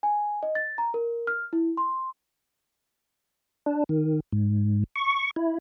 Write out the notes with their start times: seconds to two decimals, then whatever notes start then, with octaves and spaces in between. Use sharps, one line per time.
0.03 G#5
0.43 D#5
0.55 A6
0.78 A#5
0.94 A#4
1.27 F6
1.53 E4
1.77 C6
3.66 D4
3.89 D#3
4.32 G#2
4.96 C#6
5.36 E4